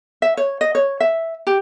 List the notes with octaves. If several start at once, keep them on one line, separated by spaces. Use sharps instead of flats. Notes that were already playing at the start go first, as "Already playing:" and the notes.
E5
C#5
D#5
C#5
E5
G4